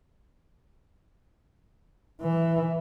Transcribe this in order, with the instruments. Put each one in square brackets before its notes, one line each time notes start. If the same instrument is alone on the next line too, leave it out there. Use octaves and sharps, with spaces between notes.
[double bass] E3